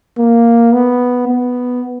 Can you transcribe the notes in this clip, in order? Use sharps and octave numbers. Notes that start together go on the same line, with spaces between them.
A#3
B3
B3